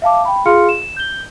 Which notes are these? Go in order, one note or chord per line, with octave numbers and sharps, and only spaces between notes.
E5 F5 A5 D6
G5 B5
F4 G#4 F5 C6 F6 C#7
E7
G6 G7